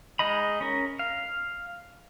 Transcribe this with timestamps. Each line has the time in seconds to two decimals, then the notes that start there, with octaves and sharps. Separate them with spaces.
0.19 G#3 D#4 D#5 B5
0.61 C#4 A#4
0.99 F5